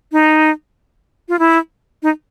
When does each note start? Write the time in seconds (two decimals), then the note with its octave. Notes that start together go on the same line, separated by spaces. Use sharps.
0.12 D#4
1.29 F4
1.39 E4
2.03 D#4